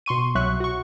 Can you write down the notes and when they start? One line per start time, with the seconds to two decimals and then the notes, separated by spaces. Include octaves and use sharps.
0.06 B2 C6 C#6 D#7
0.35 C2 F#3 E5 C#6 F#6
0.60 F#4 C#6